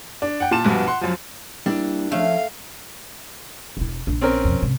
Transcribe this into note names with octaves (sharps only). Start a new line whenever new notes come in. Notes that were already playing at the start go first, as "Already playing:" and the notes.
D4
F#5 G5
A#2 A5 E7
A#1 G2 B2 B3
F#5 C6
F#2 F3
G3 A#3 D4 E4
F3 A3 C#4 F5
E1 E4
A#1 D4
C4 C#4 A#4
F2 B2
G#2 C3